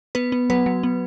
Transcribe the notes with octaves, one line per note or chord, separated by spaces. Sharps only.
B3 B4
B3
F#3 B4
F#3
B3